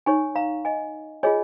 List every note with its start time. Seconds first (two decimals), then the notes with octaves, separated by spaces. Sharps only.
0.06 D#4 C#5 G#5 C#6
0.35 F5 A#5
0.65 D#5 G#5
1.23 F4 G#4 C#5 D#5 G#5